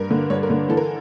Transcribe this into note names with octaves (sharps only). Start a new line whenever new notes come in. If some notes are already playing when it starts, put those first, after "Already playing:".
Already playing: G2 A#4
D3
G2 C#5
A#4
D3
E3 A4
A#4